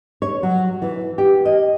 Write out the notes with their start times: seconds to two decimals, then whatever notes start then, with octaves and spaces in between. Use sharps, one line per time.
0.22 C#5
0.43 F#3
0.82 E3
1.18 G4
1.45 D#5